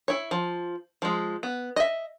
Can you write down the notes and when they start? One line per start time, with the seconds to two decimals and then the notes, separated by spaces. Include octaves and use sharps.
0.08 E4 C#5
0.31 F3
1.02 F3 G#3
1.43 B3
1.76 D#5 E5